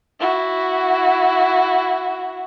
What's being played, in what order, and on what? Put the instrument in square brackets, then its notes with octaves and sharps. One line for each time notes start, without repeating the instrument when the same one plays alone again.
[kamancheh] E4 F#4